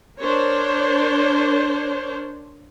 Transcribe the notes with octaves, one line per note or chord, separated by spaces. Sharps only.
D4 A#4 C5 C#5